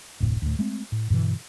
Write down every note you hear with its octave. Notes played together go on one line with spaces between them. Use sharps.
F1 D2 A2 C3
D2 A2
G#3 A3 C4
A2
G2 B2 D3 E3